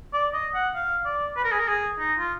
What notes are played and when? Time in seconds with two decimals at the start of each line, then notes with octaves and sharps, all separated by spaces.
0.13 D5
0.34 D#5
0.55 F#5
0.75 F5
1.06 D5
1.37 B4
1.44 A#4
1.52 G#4
1.59 A#4
1.68 G#4
1.99 D#4
2.19 F4